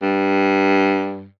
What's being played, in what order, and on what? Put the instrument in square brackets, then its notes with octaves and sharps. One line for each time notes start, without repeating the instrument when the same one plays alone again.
[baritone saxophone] G2